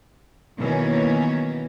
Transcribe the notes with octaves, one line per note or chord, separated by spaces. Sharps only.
B2 D#3 E3 F#3 A#3 C#4